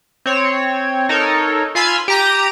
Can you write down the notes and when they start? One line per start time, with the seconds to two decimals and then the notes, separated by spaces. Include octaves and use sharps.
0.26 C4 C#5
1.09 D#4 A4 A#4 C#5
1.75 F4 F5 G#5 B5 C6 E6
2.08 G4 A#5 D#7